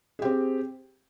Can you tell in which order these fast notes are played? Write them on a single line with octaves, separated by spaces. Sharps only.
G#4 G4 C4